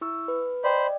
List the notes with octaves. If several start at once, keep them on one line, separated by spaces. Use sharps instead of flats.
E4 C#6 E6
B4
C5 D5 D#5 G5 B5